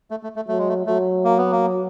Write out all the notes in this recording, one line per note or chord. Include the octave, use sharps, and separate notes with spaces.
A3
A3
A3
F#3 A3
G#3
A3
F#3 A3
A#3
B3
A#3